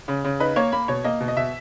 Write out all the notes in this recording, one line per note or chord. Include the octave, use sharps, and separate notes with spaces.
C#3
C#3
D#4 B4
A#3 C#5
A#3 B5
B2 C#5
A#3 D#5
B2
D#5
B2 E5